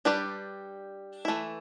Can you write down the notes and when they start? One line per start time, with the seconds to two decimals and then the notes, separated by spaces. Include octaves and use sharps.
0.05 G3 D4 G4 B4 D5
1.25 E3 A3 E4